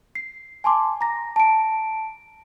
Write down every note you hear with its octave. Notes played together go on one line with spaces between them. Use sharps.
C7
G#5 A5 C6 D6
A#5 A#6
A5 D7